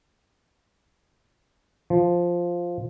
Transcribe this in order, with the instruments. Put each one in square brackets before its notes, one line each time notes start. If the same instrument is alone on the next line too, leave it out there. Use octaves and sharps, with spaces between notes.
[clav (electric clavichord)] F3